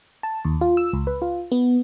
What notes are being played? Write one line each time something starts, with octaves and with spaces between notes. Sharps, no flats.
A5
D#2
F4
E6
C#2
B4
F4
B3